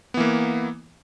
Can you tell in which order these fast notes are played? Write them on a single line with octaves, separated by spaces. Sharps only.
B3 E3 A#3